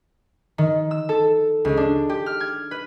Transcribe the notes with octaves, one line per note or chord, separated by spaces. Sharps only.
D#3
E6
A4
C#2
D4
G4
F6
G#6
B4